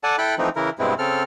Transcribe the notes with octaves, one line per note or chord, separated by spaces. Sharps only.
A4 D5 F#5 G#5 A5
E4 A4 G5 B5 F#6
E3 F3 A3 C4 D#4
C#3 E3 E4 A#4
G2 B2 G#3 C4 E4
C#3 C4 A4 F6